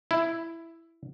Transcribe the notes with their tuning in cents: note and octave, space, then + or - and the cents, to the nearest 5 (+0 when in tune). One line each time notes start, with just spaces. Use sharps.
E4 +5